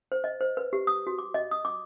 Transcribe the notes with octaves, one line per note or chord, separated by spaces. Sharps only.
C5
D#5
C5
B4
G4
D#6
F#4
D6
D#5
D#6
D6